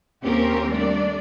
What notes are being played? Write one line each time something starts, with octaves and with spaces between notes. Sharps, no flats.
D#2 C4 C#4 G4 A#4
G3 A3 D4 D5